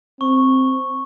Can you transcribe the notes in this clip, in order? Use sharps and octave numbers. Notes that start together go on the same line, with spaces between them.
C4 C#6